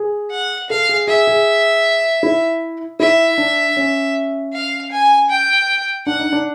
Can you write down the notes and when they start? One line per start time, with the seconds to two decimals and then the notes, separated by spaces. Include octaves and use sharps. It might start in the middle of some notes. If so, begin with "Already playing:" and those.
Already playing: G#4
0.31 F#5
0.70 A4 F5
0.89 G#4
1.08 G#4 E5
1.27 G#4
2.23 E4
3.00 E4 E5
3.38 D4
3.77 C#4
4.53 F5
4.91 G#5
5.30 G5
6.06 D4 F#5
6.20 D#4
6.33 D4